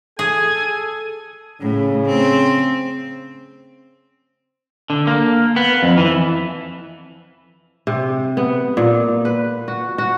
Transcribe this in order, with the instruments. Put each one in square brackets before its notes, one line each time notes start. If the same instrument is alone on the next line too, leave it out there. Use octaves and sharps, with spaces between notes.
[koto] G#4 [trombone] A4 [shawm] G#5
[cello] A2 [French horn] C#3
[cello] C4
[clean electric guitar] D3
A#3
B3
F2
E3
[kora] C3
B3
A#2
B4
F#4
F#4